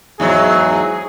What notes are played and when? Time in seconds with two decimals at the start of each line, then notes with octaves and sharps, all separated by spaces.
0.20 E2 G#2 F#3 G#4